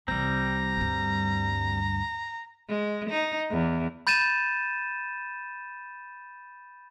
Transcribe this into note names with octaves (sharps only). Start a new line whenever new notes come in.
C2 E3 G3 C4 A#5
D2 G2
G#3
D#4
E2
B5 G6 A6 D#7 E7